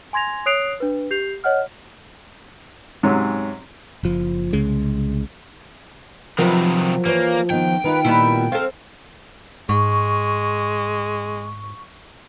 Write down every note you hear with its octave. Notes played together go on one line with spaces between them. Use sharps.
G#5 C6 G#6 A#6 F7
C#5 D#6 F#6 C7 D7 F7
D4 B4
G4 G6 C7 F7
C#5 D#5 F#5 F6
G#2 C3 F#3 C#4
F#1 F3
C2 C#3 G#3
C3 D#3 F3 F#3 A#4 B4
E3 A#3 C5 C#5
D#3 B3 G5
D#3 D#4 F4 B4
A#2 G3 B3 E4
C4 A4 F5
G#2 G#3 C#6